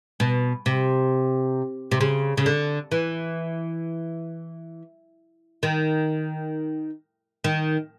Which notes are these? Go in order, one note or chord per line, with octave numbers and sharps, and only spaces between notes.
B2
C3
C3
C#3
C#3
D3
E3
D#3
D#3